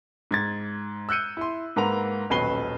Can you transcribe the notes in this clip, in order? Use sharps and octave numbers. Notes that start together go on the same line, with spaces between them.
G#2 G#6 A6
E6 F#6 G6 C#7 D#7
E4 C6
G#2 A#3 B4 F#5 A#5 F7
D#1 B1 C#4 B4 C7 G7